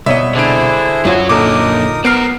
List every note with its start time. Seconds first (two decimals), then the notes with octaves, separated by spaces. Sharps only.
0.06 C2 B2 C#5 D#5 E5
0.36 D3 D4 E4 G#4 C5 D7
1.05 F#2 F#3 F4 F#4
1.29 A#2 D3 D#4 A4 A#4 D6 D#6
2.05 B3 A#4 C5 F#5 F6 C7 D7